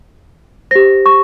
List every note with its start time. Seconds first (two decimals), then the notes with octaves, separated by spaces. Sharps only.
0.71 G4 C5 A#6
1.06 C#6